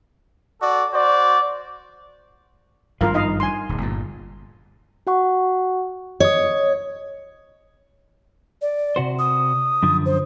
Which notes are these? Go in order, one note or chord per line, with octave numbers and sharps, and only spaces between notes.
F#4 A4 D5
F#4 C5 D5
G#1 G2 F3 F4 A#4 F5
D#4 D#5 F5
G#5 C6
D1
G1 A#2
F#4 F#5 C#6
C#5 D#5 D#6
D5
C3 F#4 C5
D#6
F#2 D3 F3
C5